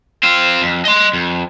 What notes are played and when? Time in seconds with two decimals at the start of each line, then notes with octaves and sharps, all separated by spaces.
0.23 C4 F4
0.62 F2
0.85 D#5 C6
1.13 F2